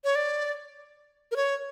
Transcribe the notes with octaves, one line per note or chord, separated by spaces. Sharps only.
C#5
D5
A#4
C#5